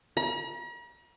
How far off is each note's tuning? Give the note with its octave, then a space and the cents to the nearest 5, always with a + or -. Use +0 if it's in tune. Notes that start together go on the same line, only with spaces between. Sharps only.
A#5 +45